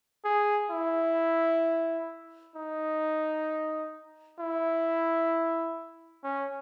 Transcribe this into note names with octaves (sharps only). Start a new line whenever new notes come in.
G#4
E4
D#4
E4
C#4